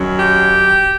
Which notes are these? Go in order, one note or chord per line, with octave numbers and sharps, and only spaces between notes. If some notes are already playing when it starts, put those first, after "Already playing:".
Already playing: F#2 D#3 F#3
G4